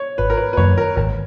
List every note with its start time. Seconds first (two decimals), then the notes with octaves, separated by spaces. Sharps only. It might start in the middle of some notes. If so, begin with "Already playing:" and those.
Already playing: C#5
0.18 G#1 B4
0.30 A#4
0.37 B4
0.53 B4
0.57 F#2 D#3 A#3 C#5
0.78 A#4
0.96 G#1 A#4